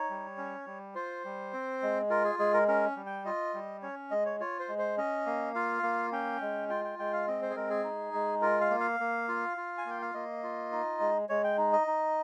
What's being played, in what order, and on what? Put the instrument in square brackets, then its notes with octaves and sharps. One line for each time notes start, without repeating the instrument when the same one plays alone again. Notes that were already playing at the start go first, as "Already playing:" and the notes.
Already playing: [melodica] D#4 C#5
G3
C#4
G3
F4 C5
G3
C4
G#3
F4 A#4
G#4
G#3 G#4
A#4
C#4 A#4
G3
G5
F4 D#5
G3
C#4 C#5
G#3 D#5
C#5
F4 C#5
C5
G#3
C5
C#4 D#5
A#3
F4 F5
A#3
C#4 G5
G#3
F4 G5
G5
G#3 G5
F5
C4 D#5
C5
G#4
G#3 A#4
G#4
D#4
G#3
F4 A#4
F5
A#3
F5
A#3
F4
F4
G#5
A#3 G5
F5
A#3 D#5
F4
D#4
G#3
G#3 C#5
G5
D#4
D#5
D#4